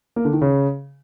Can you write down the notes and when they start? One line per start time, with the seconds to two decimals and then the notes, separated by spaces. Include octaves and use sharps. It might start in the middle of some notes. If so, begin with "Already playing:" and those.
0.16 A#3
0.25 D3
0.33 D#3
0.42 C#3